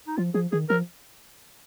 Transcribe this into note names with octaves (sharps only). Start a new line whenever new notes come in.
D#4
F3 F4
F3 G#4
D#3 G#4
F3 A#4